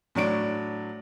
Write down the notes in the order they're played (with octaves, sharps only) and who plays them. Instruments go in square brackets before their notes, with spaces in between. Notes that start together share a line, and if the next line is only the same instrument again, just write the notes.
[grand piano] A2 F#3 D4 D7